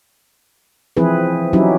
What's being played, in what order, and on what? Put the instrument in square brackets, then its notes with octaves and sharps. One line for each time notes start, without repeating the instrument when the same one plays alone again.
[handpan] E3 F3 C4 E4 G#4 B4
F#3 C#4 D#4 E4 G4